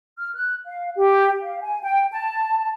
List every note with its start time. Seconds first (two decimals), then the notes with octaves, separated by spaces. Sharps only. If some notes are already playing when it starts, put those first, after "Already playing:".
0.18 F6
0.35 F#6
0.65 F5
0.96 G4
1.43 F5
1.61 G#5
1.82 G5
2.13 A5